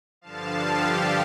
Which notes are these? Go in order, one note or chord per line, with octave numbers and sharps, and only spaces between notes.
G2 D3 F3 F5 A5
G4